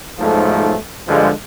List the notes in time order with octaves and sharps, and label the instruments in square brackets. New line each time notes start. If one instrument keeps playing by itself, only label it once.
[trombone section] B1 G#2 F3 A3 A4
G2 D3 F3 G#3